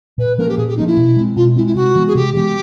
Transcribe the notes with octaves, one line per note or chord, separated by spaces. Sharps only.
A#2 B4
F3 A#3 C#4 A#4
G4
A#2 G#4
G4
F3 A#3 C#4 D#4
E4
B2
G#3 C4
B2 F4
G#3 C4 E4
E4
C3 F#4
E3 G#3 B3
G#4
C3 G4
E3 G#3 B3 G4